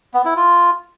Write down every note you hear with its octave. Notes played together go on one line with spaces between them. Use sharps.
B3
E4
F4